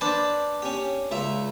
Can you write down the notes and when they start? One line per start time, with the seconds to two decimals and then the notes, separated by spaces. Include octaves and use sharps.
0.01 D4 B4 C5 A5
0.62 C#4 G4
1.11 C#2 F4 E5